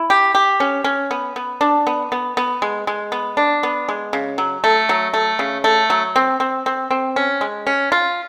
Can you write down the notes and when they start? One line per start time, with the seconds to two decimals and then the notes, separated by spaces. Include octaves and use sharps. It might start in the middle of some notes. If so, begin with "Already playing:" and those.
Already playing: E4
0.10 G4
0.35 G4
0.60 C#4
0.84 C#4
1.11 B3
1.36 B3
1.61 D4
1.87 B3
2.12 B3
2.37 B3
2.62 G#3
2.87 G#3
3.12 B3
3.37 D4
3.63 B3
3.89 G#3
4.13 C#3
4.38 F#3
4.64 A3
4.89 F#3
5.14 A3
5.39 C#3
5.64 A3
5.90 F#3
6.16 C4
6.40 C4
6.66 C4
6.91 C4
7.16 C#4
7.41 G#3
7.67 C#4
7.92 F4